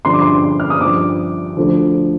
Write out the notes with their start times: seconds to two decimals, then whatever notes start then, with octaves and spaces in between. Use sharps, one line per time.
0.05 G2 D3 F3 C6
0.13 D6
0.21 C6
0.60 F6
0.70 D#6
0.80 G2 F3 D6
1.57 D2 D3 F3